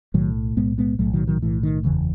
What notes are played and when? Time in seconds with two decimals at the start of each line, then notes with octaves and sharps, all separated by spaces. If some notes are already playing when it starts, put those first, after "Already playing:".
0.14 B1 A2 D#3 F#3
0.56 B1 A2 G#3 B3
0.78 G#3 B3
0.99 B1 A2 F#3 A3
1.13 D#3 F#3
1.27 D#3 F#3
1.42 B1 A2 E3
1.63 D#3
1.84 F#1 E2 C#3 E3